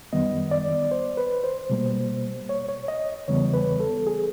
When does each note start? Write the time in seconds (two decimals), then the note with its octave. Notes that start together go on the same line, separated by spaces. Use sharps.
0.13 F#2 D#3 G3 B3 D#5
0.51 D5
0.91 C5
1.17 B4
1.44 C5
1.70 B2 G3 A#3
2.49 C#5
2.69 C#5
2.88 D#5
3.28 E2 C#3 E3 G3 B3 C#5
3.54 B4
3.80 A4
4.07 G#4